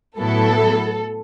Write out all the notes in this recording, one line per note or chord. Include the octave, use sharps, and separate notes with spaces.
A2 F#3 B3 E4 A4